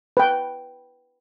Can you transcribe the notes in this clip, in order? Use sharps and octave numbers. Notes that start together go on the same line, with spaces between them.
B4 G5